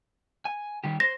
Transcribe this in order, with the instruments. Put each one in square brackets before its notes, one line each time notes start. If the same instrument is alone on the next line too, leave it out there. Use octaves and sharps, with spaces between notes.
[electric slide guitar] G#5
D#3 G3 G4
[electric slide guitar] C5 [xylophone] A#6